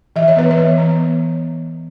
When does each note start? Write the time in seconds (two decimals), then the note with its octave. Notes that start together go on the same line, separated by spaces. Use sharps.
0.16 E3 E5
0.28 C#5
0.36 B3 B4
0.51 C#5
0.58 E3
0.78 B3